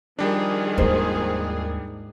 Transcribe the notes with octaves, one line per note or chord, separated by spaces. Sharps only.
D#3 F3 G3 D4 G#4
D#2 G#2 G#3 C5